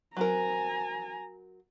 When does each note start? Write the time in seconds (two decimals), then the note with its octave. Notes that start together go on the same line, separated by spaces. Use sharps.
0.17 F#3 C4 A#4 G#5 A#5